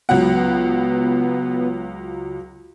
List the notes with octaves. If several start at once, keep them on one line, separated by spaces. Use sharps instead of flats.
C#2 F#3 B3 F#5